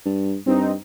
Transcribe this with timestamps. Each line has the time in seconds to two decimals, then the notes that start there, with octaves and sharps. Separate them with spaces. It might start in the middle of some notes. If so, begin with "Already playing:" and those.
0.05 G2
0.46 G2 C4 D#4